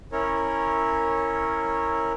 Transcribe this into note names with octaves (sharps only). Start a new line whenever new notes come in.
C#4 E4 A#4 C#5